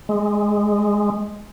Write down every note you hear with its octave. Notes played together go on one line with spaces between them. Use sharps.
G#3